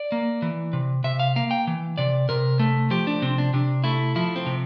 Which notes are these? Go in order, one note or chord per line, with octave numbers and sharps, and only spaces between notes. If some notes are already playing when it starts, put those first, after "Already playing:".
Already playing: D5
A#3
E3
C3
C3 E5
F5
A#3 F5
G5
E3
C3 D5
C3 A#4
A3
F3 G4
D4
C3 C4
D4
C3 D4
A3 E4
F3 E4
C4
C3